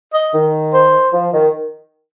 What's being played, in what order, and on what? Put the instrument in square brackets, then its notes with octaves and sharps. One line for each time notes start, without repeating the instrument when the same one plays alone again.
[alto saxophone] D#5
[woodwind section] D#3
[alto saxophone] C5
[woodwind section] F3
D#3